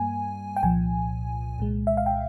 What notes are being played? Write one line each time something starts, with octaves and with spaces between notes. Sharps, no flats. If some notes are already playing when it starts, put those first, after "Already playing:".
Already playing: G2 G3 A#3 G#5
G5
C2 A#2 F3 G#5
C2 A#2 G#3
E5
F5
G5